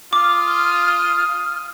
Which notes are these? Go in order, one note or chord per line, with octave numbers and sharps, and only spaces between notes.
F4 D6 D#6 F6